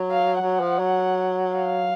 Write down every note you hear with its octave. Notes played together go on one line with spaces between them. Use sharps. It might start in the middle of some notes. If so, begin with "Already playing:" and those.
Already playing: F#3
F5
F#3 F#5
F3
F#3
F5